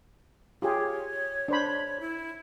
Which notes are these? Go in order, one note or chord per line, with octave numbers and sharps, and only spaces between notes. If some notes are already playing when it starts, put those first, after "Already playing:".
F4 G4 G#4 C#5
D4 C5 B5
E4